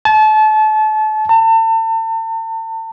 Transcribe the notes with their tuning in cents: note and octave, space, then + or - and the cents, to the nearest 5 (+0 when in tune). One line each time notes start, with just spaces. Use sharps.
A5 -30
A5 +40